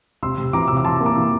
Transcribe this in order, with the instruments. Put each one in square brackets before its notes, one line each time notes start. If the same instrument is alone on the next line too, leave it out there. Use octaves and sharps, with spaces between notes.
[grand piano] C3 C6 E6
C3
E3 A#5 D6
C3 E6
D6
C3 A5 C6
A#3
A#5 D6
E3